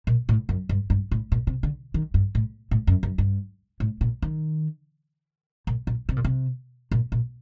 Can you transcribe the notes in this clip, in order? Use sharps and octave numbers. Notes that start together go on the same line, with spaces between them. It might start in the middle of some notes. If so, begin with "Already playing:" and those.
A#2
A2
F#2
G2
G2
A2
A#2
C3
D3
D#3
G2
A2
A2
F#2
F#2
G2
A2
A#2
D#3
A#2
A#2
C3
A#2
C3
A#2
A#2